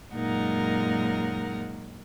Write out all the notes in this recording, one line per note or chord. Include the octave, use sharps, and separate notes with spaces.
F#2 A#2 G#3 D#4 A#4 F#5